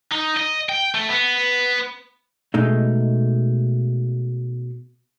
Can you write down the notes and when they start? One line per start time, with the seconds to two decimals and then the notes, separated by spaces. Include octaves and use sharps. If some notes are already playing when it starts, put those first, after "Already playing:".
0.12 D#4
0.37 D#5
0.69 G5
0.95 A3
1.09 B3
2.54 B2 G#3 A3 D#4